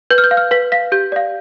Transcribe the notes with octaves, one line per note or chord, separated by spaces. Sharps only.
B4 G6
F6
G6
F5
F6
B4 B6
F5 B6
G4 G6
D5 F5